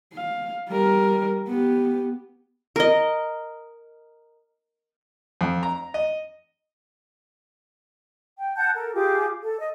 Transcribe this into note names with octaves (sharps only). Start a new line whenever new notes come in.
F5
G3 A#4
B3 G4
A#4 D#5
F2
A#5
D#5
G5
F#5 A5 F#6 G6
A4 A#4
F4 G4 G#4 D6
A4
D#5